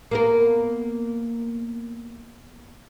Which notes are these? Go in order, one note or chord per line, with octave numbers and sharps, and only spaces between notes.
A#3 B3 A#4